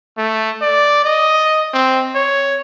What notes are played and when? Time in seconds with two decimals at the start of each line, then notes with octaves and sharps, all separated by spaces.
0.18 A3
0.62 D5
1.04 D#5
1.74 C4
2.15 C#5